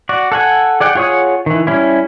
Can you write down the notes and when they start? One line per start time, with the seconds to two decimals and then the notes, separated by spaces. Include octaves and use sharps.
0.09 F#4 D5
0.32 A4 F#5 G#5
0.80 G#4 D5 F#5 G5
0.95 F4 G#4 C#5 F#5 D#6
1.46 D#3 E3
1.67 G3 C#4 E4